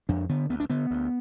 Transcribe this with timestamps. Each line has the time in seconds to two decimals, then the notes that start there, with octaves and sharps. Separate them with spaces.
0.09 F2 D4
0.29 D3 B3
0.49 D2 B3
0.60 D4
0.70 D3 B3
0.91 D2